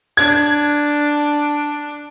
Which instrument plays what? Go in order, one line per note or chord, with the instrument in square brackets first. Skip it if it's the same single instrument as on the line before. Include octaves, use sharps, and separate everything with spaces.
[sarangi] D4 [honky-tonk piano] G#6